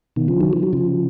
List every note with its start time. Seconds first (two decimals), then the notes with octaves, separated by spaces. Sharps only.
0.16 B2 D#3
0.28 C#3 F3
0.40 D#3 F#3
0.53 F3
0.63 F#3
0.73 C#3 F3